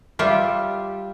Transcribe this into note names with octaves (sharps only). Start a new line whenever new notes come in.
G3 F4 G4 E5